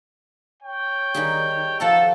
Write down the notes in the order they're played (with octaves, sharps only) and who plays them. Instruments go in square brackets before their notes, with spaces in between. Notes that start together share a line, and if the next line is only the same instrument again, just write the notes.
[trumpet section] C#5 G5
[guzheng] D#3 G3 G#4
[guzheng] F3 F#5 A#5 [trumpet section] A4